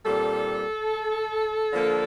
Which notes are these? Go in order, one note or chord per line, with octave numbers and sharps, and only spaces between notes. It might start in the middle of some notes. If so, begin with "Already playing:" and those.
A#2 G3 C4 A4
D3 F3 A#3 D4